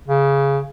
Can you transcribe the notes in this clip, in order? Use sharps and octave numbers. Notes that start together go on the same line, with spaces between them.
C#3